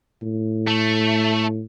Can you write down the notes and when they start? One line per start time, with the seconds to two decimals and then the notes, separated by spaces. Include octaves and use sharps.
0.22 A2
0.67 A3